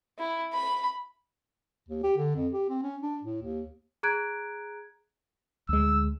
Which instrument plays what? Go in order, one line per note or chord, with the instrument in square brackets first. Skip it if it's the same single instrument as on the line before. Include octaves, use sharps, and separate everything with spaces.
[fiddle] E4
B5
[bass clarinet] D#2
G4
D3
F2
G4
C4
C#4
D4
A2
D#2
[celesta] G#4 A#5 F#6 G#6 D7
[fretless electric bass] D2 G#3 [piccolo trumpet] E6